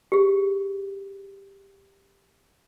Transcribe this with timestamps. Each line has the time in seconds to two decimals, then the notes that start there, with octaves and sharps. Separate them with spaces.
0.12 G4 G#4